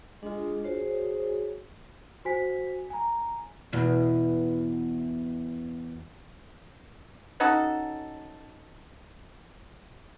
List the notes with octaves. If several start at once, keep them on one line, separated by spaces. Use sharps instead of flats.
G#3 D4 F4
F#4 G#4 C5 C#5
F#4 C5 G#5 B6
G#5 A#5
E2 B2
C#4 D#4 F#4 A4